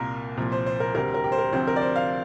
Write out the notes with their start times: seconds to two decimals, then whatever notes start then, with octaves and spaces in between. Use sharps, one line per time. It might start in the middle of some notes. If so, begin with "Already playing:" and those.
Already playing: C2 A#2 A#3 A#4
0.37 C2 A#2 F3
0.52 C5
0.66 C5
0.80 A#4
0.94 D2 C3 G3 C4 A#4
1.14 A#4
1.24 G4
1.32 C5
1.39 A#4
1.53 D2 C3 F3 C4 C5
1.67 A#4
1.76 D5
1.81 C5
1.96 F5